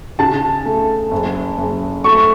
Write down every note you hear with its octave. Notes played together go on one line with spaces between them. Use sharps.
C#3 A5
A3
F#1
F#1
A3 C#6